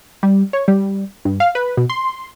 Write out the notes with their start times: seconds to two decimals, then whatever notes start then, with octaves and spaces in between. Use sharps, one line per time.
0.23 G3
0.53 C#5
0.68 G3
1.25 G2
1.40 F5
1.55 B4
1.77 B2
1.90 C6